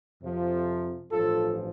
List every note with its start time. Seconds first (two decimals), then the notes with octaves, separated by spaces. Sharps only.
0.22 F2 C3 F3
1.12 A1 G2 F3 F4 A4